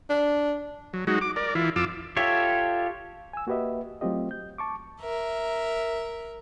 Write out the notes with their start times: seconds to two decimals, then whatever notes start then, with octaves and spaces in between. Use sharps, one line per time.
0.10 D4
0.94 F#3
1.07 F#3 G#3 D#4 F#4
1.21 D6
1.36 A#4 D5
1.55 E3 E4 F4
1.76 F2 F4 D6 E6
2.16 F4 G4 A4 C#5 E5
3.33 G#5 E6
3.47 A#3 F#4 G4 B4 D#5 E5
4.01 F#3 A3 C4 F4 G4 D#5
4.31 G6
4.58 A5 C#6 D6
5.02 A#4 E5